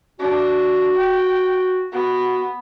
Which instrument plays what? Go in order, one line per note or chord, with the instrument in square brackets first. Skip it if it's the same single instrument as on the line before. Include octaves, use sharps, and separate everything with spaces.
[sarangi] D4 [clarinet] F#4
[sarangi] G5
[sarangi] B3 [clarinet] F#4